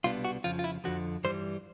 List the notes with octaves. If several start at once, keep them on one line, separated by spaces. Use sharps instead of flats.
C2 B2 G3 B3 D4 F4
F#4
F2 C#3 F3 F4
F4
E4
F2 D3 F3 F#4
G2 E3 G3 C5